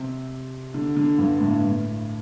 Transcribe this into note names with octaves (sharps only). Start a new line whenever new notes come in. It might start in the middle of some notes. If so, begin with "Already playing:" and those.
Already playing: C3
D3
D3
G2
A2
A2